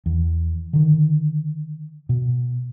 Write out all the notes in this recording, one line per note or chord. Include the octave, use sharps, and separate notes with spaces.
E2
D3 D#3
B2